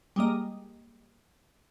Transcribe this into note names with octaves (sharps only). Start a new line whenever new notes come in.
G3 G#3 A#3 D#5